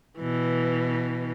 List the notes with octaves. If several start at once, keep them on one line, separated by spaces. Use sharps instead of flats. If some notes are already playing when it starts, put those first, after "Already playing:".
B2 E3